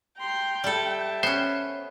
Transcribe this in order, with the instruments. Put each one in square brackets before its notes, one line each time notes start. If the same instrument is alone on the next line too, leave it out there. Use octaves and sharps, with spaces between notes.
[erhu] G5 [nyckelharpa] A#5 C6
[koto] G3 A4 [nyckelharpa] E5 A5
[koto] B3 C#4 [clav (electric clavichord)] C5